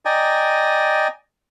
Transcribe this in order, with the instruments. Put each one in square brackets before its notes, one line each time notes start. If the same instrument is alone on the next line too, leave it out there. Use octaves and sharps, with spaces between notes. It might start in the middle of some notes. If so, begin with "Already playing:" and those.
[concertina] D5 D#5 G5 G#5 A#5